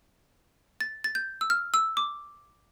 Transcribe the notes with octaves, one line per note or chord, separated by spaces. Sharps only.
A6
A6
G6
E6
F6
E6
D6